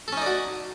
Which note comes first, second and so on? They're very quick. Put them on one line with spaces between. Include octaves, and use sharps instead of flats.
A4 C#4 D#4 D5 F#4